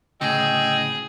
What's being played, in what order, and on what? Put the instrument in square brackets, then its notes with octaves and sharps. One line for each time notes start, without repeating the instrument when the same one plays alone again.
[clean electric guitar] D2 A2 C#3 [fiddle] G#4 [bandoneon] D#5 G5 E6